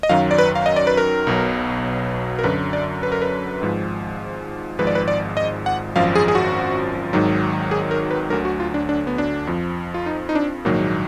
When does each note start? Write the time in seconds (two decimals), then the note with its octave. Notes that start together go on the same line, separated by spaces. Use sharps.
0.03 D#5
0.09 F#2 D#3 F#3 F5
0.31 D5
0.38 B4
0.55 F5
0.66 D#5
0.76 D5
0.87 B4
0.97 A#4
1.27 B1 B2 F#3
2.39 A#4
2.44 F#2 D3 F#3 B4
2.73 D5
3.03 B4
3.12 A#4
3.22 B4
3.61 G#1 G#2 F3
4.78 G#1 G#2 F3 B4
4.87 D5
4.95 B4
5.08 D5
5.37 D#5
5.66 F#5
5.96 G#1 F#2 F3 F5
6.16 G#4
6.28 G#4
6.35 F#4
7.13 G#1 G#2 D#3 F#3
7.71 G#4
7.91 A#4
8.11 B4
8.30 D2 D3 F#3 A#4
8.45 F#4
8.60 F4
8.74 D4
8.89 D4
9.07 B3
9.18 D4
9.47 F2 F3
9.94 F4
10.06 D#4
10.29 D#4
10.35 D4
10.65 A#1 G#2 D#3 F#3 A#3